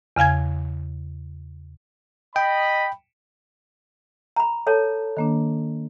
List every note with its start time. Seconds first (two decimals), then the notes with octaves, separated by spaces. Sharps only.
0.16 E2 C#3 F5 G#5 G#6
2.36 D#5 G5 B5
4.36 A#5 B5
4.67 A4 C#5 A5
5.17 D#3 A#3 D4